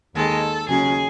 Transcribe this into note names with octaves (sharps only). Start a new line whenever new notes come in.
D#2 D#3 G#3 A4
D#2 C#3 F#3 C#4 G#4